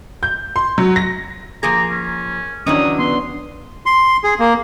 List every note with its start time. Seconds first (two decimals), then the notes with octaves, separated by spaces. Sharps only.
0.23 G6
0.56 C6
0.78 F#3
0.96 A#6
1.63 F3 A#3 G#4 A#5
1.91 C#4
2.67 D#3 E3 F#3 C#4 D4 D#6
2.99 B3 C6
3.86 C6
4.24 G#4
4.39 A#3